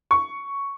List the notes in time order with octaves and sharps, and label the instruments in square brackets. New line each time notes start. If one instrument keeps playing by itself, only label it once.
[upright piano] C#6